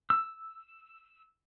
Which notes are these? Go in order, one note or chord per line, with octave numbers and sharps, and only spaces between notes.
E6